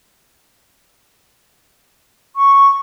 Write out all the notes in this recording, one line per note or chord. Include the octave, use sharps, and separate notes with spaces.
C#6